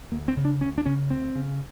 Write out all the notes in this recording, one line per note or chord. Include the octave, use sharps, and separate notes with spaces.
D2 A#3
C4
C#3
D4
D2 C#4
D4
C#3 C#4
D2 C4
C#3